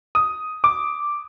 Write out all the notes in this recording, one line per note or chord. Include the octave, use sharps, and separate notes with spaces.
D#6
D6